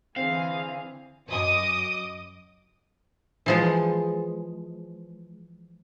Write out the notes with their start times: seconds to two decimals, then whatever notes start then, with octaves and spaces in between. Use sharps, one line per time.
0.16 D3 E3 C4 G#4 F5
1.29 F#2 D#5 D6 D#6
3.46 E3 F3 G#3